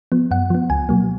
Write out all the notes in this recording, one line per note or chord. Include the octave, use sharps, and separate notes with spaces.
F3 B3
F#2 F#5
F3 B3
C#2 G#5
B2 F#3 A#3